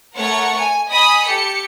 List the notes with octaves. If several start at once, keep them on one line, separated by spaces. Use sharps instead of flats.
A3 A#4 C#5 F#5 C#6
G#5
D#5 G#5 B5 D#6
G4 A4 C#7